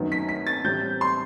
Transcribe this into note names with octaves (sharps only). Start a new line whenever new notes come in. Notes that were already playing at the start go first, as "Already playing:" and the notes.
Already playing: F#2 D#3 F#3 B3
B6
B6
A6
A2 E3 G3 C4 G6
C6